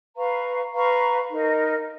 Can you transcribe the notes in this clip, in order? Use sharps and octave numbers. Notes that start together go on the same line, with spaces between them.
B4 F5 A#5 C#6
B4 F5 A#5 C#6
D#4 A#4 D#5